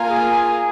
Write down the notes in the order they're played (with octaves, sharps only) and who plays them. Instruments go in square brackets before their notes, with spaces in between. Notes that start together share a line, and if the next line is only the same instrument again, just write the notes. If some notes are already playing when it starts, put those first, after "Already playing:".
Already playing: [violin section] A#3 F4 A#4 F5 G#5
[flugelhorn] G#4